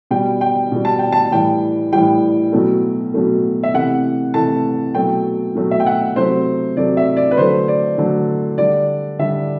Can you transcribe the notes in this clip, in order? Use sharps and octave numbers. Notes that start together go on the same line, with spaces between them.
B2 G3 G5
G5
B2 G3
A5
G5
A5
A2 E3 G3 G5
A2 E3 G3 G5
B2 F#3 A3
B2 F#3 A3
E5
C3 E3 A3 F#5
C3 E3 A3 A5
B2 F#3 A3 G5
B2 F#3 A3
E5
G5
F#5
C3 F#3 A3 C5
C3 F#3 A3 D5
E5
D5
B4
D3 F#3 A3 C5
D5
D3 F#3 A3
D3 G3 D5
D3 G3 E5